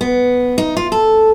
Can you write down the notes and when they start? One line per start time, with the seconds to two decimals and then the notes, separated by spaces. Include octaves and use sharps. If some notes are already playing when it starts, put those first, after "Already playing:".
0.01 B3
0.58 D#4
0.77 F4
0.92 A4